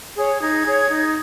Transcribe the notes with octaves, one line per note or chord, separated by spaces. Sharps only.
G#4 C#5
D#4 G#6
G#4 C#5
D#4